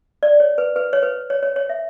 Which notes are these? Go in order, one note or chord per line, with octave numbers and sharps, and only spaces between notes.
D5
C#5
B4
B4
C#5
B4
C#5
C#5
C#5
E5